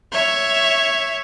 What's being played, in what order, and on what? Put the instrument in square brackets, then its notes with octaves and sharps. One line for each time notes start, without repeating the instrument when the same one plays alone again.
[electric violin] C#5 E5